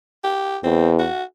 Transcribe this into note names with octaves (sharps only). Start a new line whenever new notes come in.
G4
E2 C4
F#4